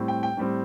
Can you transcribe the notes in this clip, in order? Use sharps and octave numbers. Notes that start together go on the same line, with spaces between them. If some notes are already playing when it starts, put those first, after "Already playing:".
Already playing: A2 G3 C4
G5
G5
A2 G3 C4